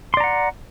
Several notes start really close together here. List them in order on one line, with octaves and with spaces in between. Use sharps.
C6 D5 A#5 F#5